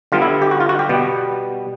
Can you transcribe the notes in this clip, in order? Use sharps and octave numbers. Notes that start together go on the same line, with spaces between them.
D3 G3 B3 F4
E4
G4
F#4
F4
F#4
G4
B2 G3 B3